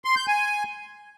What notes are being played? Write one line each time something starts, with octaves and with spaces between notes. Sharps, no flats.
C6
G6
G#5